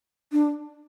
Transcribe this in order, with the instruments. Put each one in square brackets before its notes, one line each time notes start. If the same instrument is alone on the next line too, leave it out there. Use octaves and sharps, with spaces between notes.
[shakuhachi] D4